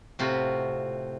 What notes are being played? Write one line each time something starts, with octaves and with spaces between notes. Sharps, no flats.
A2 C3 F4 F#4 B5